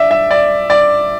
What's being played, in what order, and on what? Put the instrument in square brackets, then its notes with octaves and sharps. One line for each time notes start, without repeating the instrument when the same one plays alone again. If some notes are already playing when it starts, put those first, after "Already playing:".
Already playing: [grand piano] D5 E5
E5
D5
D5